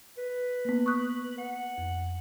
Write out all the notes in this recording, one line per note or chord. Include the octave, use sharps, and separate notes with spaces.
B4
A#3 B3
C#6 D#6 F#6
F#5
F2